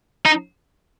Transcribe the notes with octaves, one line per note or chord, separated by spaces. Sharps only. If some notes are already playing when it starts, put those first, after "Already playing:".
D#4